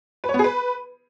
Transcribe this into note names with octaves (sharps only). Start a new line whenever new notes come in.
B4
C#5
B3
G#4
B4